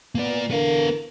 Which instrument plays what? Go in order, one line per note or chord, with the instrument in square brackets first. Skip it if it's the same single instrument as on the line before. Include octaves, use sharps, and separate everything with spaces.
[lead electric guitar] A#3 D5 [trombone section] B3
[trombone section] D3 E3 A#4 [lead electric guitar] B3 F5